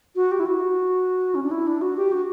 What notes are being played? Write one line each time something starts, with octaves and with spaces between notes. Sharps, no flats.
F#4
G4
E4
F#4
C#4
D4
E4
D4
F#4
G4
F#4